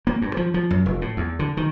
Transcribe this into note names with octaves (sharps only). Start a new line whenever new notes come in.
A#3
G2
F3
F3
F#2
F1
A2
E2
D3
D#3